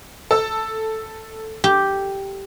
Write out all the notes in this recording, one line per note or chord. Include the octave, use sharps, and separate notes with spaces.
A4 E6
G4